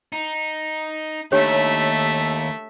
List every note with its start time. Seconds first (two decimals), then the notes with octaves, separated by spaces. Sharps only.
0.13 D#4
1.32 D#2 A3 D4 G4 C#5 E5